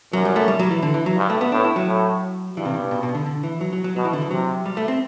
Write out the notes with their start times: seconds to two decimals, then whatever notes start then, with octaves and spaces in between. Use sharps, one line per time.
0.13 F#2 F#3
0.25 G3
0.36 A3
0.48 G3
0.59 F#3
0.71 E3
0.83 D3
0.94 E3
1.06 F#3
1.17 G2
1.30 A3
1.41 B3
1.52 A2 D4
1.64 E4
1.76 F#3
1.87 A2
2.57 G2 E3
2.65 C3
2.74 B2
2.91 B2
3.03 B2
3.15 D3
3.26 D3
3.43 E3
3.61 F#3
3.73 F#3
3.84 F#3
3.96 B2 F#3
4.05 E3
4.13 D3
4.22 E3
4.31 C3 F#3
4.66 G3
4.77 A3
4.88 C4